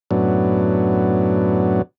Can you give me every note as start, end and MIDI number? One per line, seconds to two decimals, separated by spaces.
0.11 1.82 42
0.11 1.82 45
0.11 1.82 54
0.11 1.82 59
0.11 1.82 62